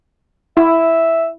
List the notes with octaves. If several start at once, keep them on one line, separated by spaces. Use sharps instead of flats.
E4 E5